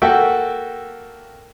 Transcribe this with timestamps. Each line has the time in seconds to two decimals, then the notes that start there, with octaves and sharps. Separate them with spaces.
0.02 A#3 F#4 A4 E5 G5